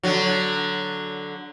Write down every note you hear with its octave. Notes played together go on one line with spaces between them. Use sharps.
D3 F#3